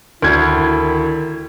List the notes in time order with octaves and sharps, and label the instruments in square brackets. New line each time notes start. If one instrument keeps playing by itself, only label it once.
[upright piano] D2 G#6 [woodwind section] D#3 E4